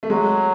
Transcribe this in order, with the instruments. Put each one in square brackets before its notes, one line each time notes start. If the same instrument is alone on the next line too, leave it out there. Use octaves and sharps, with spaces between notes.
[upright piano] A3
[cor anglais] F#3 [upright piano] G#3